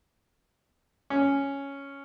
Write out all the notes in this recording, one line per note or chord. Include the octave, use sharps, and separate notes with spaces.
C#4